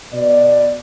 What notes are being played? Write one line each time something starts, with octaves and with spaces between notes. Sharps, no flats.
B2 D5